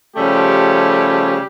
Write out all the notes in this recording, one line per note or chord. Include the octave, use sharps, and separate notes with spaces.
C#3 F3 G3 A3 C#4 G4